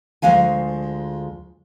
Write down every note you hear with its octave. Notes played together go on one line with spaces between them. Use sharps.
D2 F3 G#3 F5 G#5